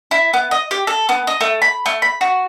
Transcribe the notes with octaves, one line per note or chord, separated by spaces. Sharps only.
E4
B3
D#5
G4
A4
B3
D#5
A3
B5
A3
B5
F#4